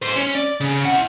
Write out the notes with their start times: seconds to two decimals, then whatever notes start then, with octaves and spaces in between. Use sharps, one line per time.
0.02 G#4 C5
0.16 C#4
0.35 D5
0.60 C#3
0.85 E4 F#5